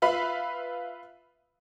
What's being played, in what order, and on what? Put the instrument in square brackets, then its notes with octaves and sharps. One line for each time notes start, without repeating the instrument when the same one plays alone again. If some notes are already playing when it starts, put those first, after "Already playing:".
[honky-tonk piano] F4 B4 E5 F5 B5